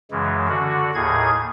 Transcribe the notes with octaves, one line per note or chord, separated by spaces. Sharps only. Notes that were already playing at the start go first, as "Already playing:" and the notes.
F#2 C#3 E3 G#3
D3 F#4
D#2 A2 G#4 G#6